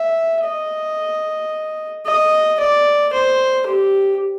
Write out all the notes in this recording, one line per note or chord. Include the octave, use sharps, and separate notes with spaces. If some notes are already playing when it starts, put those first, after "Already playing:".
Already playing: E5
D#5
D#5
D5
C5
G4